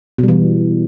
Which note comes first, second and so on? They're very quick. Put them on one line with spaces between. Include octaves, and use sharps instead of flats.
B2 G3 E3